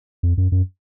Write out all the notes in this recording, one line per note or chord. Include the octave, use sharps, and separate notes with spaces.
F2
F#2
F#2